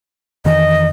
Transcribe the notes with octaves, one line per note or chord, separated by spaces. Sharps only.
F2 D#3 E3 D#5